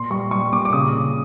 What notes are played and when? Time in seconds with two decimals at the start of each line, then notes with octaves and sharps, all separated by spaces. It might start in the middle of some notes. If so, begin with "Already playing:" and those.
Already playing: A#2 C6
0.10 G3 C#6
0.31 G3 C#6
0.52 A#2 D6
0.65 D6
0.73 C#3 D#6
0.93 C#3